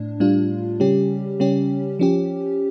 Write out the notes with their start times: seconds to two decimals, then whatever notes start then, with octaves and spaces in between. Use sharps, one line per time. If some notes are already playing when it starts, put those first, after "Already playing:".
Already playing: A2 D4
0.20 A2 G3 D4 F4
0.80 C#3 G3 C#4 G4
1.40 C#3 G3 C#4 G4
1.99 F3 C#4 G4